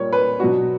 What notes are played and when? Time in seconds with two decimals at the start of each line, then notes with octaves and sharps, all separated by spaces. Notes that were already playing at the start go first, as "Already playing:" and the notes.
Already playing: A#2 G3 A#3 C#5
0.13 B4
0.40 B2 F#3 B3 D4 F#4